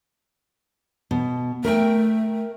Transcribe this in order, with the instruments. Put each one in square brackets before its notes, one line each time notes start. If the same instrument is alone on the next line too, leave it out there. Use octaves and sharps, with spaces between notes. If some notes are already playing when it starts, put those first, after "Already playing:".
[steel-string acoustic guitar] B2
[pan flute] A3 [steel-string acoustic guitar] A#4 E5 G5